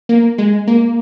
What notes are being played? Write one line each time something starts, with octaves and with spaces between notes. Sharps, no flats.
A#3
G#3
A#3